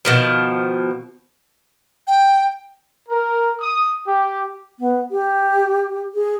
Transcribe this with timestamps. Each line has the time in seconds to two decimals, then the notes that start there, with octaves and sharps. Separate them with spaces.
0.05 B2 D#3 F3
2.07 G5
3.09 A#4
3.61 D#6
4.07 G4
4.80 B3
5.11 G4
6.15 G#4